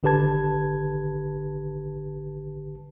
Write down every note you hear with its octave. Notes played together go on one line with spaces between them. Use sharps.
G#1 D3 G4 B4 A5 G#6